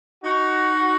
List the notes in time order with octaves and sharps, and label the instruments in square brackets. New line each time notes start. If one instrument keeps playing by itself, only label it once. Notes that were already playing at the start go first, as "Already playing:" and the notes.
[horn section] D#4 F#4